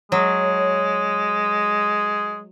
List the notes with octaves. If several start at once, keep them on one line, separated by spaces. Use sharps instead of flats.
F#3 G#3